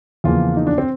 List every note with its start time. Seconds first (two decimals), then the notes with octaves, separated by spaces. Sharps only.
0.24 E2 C#3 F3 A#3 F4
0.57 D#4
0.67 D4
0.78 C4